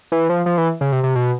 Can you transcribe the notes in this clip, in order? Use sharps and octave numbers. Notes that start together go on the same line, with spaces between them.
E3
F3
F3
E3
C#3
C3
C3
B2